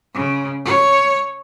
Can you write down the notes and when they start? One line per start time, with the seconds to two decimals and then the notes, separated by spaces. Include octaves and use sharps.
0.14 C#3
0.65 C#5